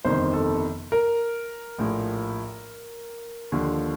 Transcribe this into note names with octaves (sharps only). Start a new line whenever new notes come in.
G1 F2 C3 D#3 C5
A4
A#4
A#1 A2 F3
D#2 D3 F3